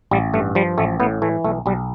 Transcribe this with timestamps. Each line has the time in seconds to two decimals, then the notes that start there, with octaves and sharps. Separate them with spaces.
0.11 A1 G3
0.34 G2 A3
0.55 F3 G3
0.78 A1 A3
1.00 A2 B3
1.22 E3 A3
1.44 B1 A3
1.66 B1 G3